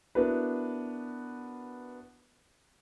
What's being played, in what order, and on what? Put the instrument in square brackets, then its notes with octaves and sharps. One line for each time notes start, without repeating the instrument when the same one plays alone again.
[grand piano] B3 D4 E4 F#4 A#4 B4